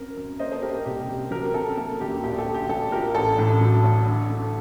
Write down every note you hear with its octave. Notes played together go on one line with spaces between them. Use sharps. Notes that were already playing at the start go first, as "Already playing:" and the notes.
Already playing: F#2 C4 A#4
F#2
A#3 C5 D#5
A4 C5
A#3 G4 A#4
A4
C2 G4
C2 G4
F#3 G4 A#4
C3 A4
A#3 A4
D2 G4
A#1 G4
A4
A3
G4
A3 A4
A#2 G4 A#4
A1 A4
A2
F#3
A1
D3
A3